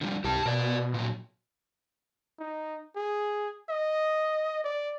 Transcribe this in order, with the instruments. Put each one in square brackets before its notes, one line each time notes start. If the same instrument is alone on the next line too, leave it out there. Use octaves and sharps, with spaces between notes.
[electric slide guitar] D3 F3 G3
[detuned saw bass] C2 [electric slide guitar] G4 A5
[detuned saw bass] B2 [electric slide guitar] A#4 D5
[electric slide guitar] A#2 F#3
[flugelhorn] D#4
G#4
D#5
D5